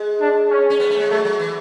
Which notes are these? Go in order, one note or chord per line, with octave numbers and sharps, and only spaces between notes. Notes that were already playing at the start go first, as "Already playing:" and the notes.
Already playing: G#3
D4
C#4
C#4
B3
A3
G#3
F#3 A3
F#3
E3